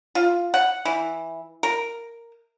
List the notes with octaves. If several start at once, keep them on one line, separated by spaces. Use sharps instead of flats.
F4
F#5
E3
A#4